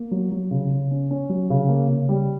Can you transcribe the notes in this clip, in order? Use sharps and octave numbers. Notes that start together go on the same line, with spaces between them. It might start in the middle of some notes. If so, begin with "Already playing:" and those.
Already playing: A#3
F#3
F#3
C#3
C#3
C#4
C#4
F#3
C#3
A#3
C#3
G3